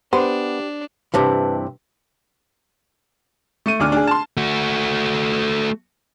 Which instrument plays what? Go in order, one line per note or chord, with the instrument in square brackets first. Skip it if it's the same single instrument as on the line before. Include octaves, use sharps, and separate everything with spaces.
[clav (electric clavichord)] B3 [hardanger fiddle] D4 [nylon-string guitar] G4 [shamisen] C5
[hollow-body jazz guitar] G2 C3 E3 [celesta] B4 A5
[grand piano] A3 C#6 D#7
D1 D2 D4 D6 F6
D4 G#4
A5 C6
[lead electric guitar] A3 F#4